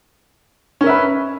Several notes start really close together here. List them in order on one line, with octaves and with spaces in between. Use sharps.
C#4 A#4 E5 B4